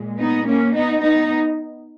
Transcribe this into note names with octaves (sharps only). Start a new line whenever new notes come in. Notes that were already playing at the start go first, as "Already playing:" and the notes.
Already playing: A#2 G#3
B3 D#4
A#3 C#4
B3 D#4
B3 D#4